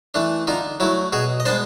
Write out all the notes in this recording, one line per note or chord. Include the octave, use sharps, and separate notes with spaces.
E3 A3 D4
D3 D#4 F4
F#3 A3 E4
B2 F#4 G#4
D#5
G#3 B3 D4 C5 D5